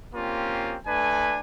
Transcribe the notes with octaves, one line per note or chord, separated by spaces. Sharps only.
A#3 C4 C#4 F4 G4
A3 D4 B4 G#5